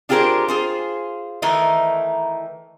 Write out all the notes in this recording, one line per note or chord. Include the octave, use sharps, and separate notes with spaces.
D4 F4 G4 G#4 A#4 C5
F4 G#4 C5
D#3 E3 A3 D#4 E4